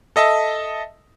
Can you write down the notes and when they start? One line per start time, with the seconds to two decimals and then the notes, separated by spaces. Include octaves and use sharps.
0.16 A4 D#5 E5 A5